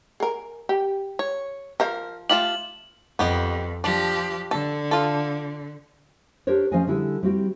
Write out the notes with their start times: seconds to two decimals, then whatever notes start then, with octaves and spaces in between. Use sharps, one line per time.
0.20 G#4 A#4
0.69 G4
1.19 C#5
1.80 F3 A#4 C5 F5
2.30 A3 F4 G4 E7 F#7
3.19 F2 B3 G4 D#5
3.84 F3 D4 G4
4.51 D3 A4
4.91 F4 A4
6.47 D4 G4 A#4 C5 C#5
6.72 F3 C#4 C5 D#5 F5 G#5
6.87 D3 G3 E4 G#4
7.23 G3 C4 E4 F#4 G4